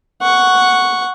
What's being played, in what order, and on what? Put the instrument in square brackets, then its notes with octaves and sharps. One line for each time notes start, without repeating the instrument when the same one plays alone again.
[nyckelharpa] F#5 C#6